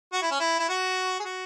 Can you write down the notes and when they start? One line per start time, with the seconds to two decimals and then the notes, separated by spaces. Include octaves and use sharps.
0.13 F#4
0.22 E4
0.31 C#4
0.40 E4
0.60 E4
0.69 F#4
1.20 G#4
1.25 F#4